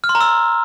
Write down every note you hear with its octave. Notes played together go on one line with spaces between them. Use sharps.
F6
C6
A#5
E6